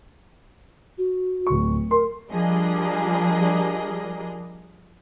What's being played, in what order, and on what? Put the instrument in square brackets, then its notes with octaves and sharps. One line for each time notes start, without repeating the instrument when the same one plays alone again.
[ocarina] F#4
[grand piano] D1 C#6
[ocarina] A#4 [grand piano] C6
[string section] F3 G3 D4 G#4 A#4 D#5